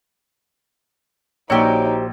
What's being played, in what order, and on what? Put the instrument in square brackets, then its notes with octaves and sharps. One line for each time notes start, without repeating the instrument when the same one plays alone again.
[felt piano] A#1 E6 [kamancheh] D#4 [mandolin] F#4 G4 C5 [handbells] C#5 G5